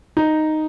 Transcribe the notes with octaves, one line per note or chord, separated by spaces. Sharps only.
D#4